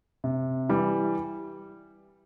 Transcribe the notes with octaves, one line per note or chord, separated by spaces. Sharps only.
C3
E3 G3